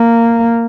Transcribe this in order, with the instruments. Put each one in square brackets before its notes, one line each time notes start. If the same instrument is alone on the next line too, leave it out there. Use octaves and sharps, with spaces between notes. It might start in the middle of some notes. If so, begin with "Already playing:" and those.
Already playing: [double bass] A#3